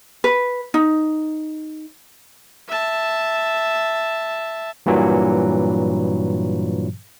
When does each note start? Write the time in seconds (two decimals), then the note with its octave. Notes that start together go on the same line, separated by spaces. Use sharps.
0.24 B4
0.74 D#4
2.68 E5 A5
4.86 G2 A#2 E3 F#3